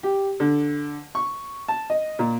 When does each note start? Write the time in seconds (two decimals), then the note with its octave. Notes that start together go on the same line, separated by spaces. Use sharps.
0.03 G4
0.40 D3
1.15 C#6
1.68 A5
1.90 D#5
2.19 A#2